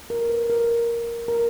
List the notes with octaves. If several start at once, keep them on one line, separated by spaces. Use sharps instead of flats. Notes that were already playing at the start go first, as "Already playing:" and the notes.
A#4
B4
A#4
A#4